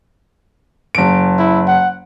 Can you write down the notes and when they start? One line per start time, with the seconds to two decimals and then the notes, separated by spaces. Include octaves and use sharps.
0.95 F#1 D7
1.39 E4
1.68 F#5